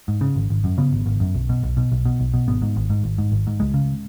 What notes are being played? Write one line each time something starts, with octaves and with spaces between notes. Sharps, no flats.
G#2
C#3
G#1
G#1
F#2
C#3 B3
G#1
G#1
F#2
B1
B2
B1
B2
B1
B2
B1
B2
G#1 B3
G#2
G#1
G#2
G#1
G#2
G#1
G#2
C#2 G#3
C#3